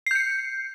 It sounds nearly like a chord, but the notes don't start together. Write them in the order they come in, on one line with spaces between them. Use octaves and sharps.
C7 G6 C#7